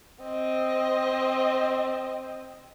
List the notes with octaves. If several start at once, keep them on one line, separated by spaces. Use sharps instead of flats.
C4 D#5